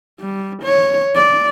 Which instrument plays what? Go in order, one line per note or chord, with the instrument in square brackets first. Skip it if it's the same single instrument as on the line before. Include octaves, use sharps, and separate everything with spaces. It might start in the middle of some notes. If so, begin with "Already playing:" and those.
[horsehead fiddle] G3
C#5
D5